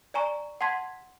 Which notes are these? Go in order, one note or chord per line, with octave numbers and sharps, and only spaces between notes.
D5 G#5 A#5 C#6
F#5 A5 C6 G#6 B6